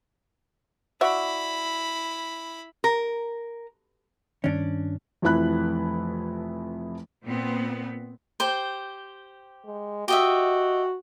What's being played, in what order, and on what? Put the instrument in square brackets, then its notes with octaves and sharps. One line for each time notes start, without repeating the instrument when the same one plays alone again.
[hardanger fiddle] E4 B5 [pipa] F#4 D5 E5
[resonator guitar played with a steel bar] A#4
[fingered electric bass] G2 D#3 [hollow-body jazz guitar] C#4 D4
[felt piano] F1 F2 E3 E4 B5 F#6
[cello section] A#2 B3 C4
[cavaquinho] G4 C5
[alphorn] G#3
[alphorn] F#4 [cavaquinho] G4 D#5 E5